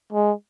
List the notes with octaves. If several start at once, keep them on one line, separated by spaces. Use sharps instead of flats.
G#3